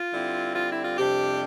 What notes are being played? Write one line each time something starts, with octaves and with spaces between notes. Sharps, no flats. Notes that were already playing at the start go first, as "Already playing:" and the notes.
Already playing: F4
D3 G3 C4 E4
F4
E4
F4
F2 C3 G3 D4 G4